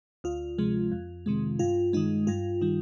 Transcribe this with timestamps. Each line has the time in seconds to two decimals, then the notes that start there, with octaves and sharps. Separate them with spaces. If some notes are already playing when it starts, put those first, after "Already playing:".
0.24 D2 F4
0.58 C3 F3 G#3
0.92 F2
1.26 C3 D#3 G#3
1.59 G2 F4
1.93 D#3 G#3 D#4
2.27 G2 F4
2.61 D#3 G3